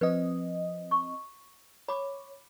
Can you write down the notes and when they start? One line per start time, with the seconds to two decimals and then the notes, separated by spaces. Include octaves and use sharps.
0.01 F3 C4 B4 D#5
0.91 C#6
1.88 C#5 B5 D6